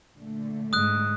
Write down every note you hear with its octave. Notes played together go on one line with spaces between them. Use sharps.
A#2 D3 A3
G#2 D#6 F#6